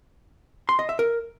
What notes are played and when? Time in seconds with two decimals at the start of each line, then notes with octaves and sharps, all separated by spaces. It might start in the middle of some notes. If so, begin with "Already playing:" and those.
0.69 C6
0.79 D#5
0.89 E5
0.99 A#4